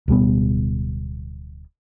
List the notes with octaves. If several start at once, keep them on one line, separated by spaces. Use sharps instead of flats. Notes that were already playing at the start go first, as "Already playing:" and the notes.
D1 B2 G3 B3